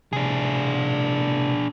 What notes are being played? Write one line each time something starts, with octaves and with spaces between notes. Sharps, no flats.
A2 C3 D4 G#4